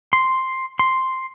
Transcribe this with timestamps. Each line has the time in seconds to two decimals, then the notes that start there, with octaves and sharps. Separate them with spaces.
0.13 C6
0.79 C6